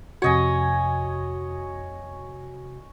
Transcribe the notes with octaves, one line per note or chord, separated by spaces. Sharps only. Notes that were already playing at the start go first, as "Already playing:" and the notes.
F2 C3 F#4 C#5 D#5 G#5